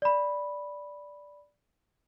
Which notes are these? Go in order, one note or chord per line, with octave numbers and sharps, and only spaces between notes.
D5 B5